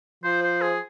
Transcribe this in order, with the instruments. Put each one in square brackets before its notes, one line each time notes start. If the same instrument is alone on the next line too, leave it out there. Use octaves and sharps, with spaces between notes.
[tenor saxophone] F3 [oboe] C5
[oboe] C5
G#4